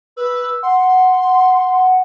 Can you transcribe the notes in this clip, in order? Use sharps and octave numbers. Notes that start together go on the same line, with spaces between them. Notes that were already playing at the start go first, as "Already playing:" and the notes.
B4 E6
F#5 C6